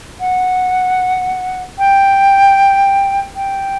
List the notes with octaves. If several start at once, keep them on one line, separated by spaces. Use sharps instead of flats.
F#5
G5
G5